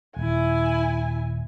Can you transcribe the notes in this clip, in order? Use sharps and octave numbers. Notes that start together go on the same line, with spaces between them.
D#1 E4 G#5